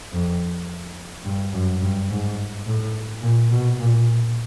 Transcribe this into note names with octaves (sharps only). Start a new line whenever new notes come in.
F2
G2
F#2
G2
G#2
A2
A#2
B2
A#2